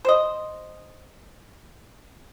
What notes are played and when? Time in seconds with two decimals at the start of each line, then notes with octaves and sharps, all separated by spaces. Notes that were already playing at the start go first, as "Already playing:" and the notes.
0.05 C5 D#5